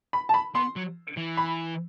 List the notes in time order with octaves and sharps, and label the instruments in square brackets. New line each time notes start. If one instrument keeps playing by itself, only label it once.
[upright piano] B5
A5
B5
[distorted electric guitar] B3 [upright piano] C6
[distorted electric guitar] F#3
E3
[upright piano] B5